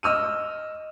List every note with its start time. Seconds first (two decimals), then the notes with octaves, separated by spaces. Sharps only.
0.03 D#5 E6 F6 D#7